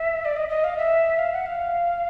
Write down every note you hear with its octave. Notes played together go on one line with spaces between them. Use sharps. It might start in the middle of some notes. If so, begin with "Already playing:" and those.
Already playing: E5
D5
D#5
D#5
F5
E5
F5
F#5
F5